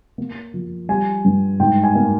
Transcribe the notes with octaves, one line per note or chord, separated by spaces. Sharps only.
A#3
F3
G3 G#5
G2
G#2 G5
G#5
A#3